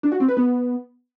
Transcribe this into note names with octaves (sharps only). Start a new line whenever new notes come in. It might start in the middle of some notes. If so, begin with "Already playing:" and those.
D4
F#4
C4
B4
B3